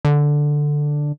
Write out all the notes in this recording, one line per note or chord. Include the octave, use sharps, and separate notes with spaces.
D3